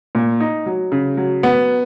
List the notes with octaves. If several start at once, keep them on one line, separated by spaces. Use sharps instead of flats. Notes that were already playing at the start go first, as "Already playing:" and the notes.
A#2
D#4
F#3
C#3
F#3
B3